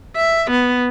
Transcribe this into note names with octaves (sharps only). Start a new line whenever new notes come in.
E5
B3